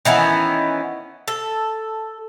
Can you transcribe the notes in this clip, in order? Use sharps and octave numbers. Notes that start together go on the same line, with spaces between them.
D#3 E3 B3 C#4
A4